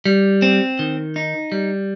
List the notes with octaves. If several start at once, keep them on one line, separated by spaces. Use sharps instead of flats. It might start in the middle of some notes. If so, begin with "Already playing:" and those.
G3
C4
D#3
D#4
G3